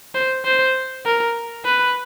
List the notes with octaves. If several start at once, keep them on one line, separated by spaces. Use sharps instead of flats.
C5
C5
A#4
B4